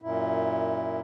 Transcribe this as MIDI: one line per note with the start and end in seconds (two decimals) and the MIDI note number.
0.02 1.00 42
0.02 1.00 46
0.02 1.00 64